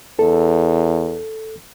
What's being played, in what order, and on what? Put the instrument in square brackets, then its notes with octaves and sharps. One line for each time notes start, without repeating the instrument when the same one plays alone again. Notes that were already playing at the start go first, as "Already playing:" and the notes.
[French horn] E2 [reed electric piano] A4